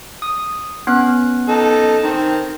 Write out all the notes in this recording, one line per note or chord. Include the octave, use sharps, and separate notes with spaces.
D#6
B3 C#4 F#6
D#4 A4
D#3 C4